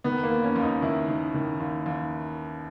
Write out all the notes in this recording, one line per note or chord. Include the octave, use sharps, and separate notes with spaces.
D#3 B3
A#3
D#2
C#4
D#2
D#4
D#3 E4
D#3
D#3
D#2
D#2